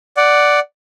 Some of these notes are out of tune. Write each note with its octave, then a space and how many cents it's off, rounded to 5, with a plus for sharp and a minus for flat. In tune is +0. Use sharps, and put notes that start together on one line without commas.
D5 +0 F#5 +5